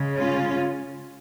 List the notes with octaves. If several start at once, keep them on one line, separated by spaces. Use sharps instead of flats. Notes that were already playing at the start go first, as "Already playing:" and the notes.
Already playing: C#3 G#3
C#4 F4